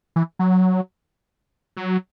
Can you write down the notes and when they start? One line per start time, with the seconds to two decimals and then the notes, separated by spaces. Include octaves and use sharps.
0.16 E3
0.39 F#3
1.77 F#3